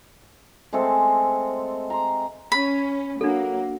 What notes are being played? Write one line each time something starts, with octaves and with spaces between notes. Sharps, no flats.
G#3 A3 C4 A4
A#5 C6
C#4 B5
F#3 A#3 D4 A4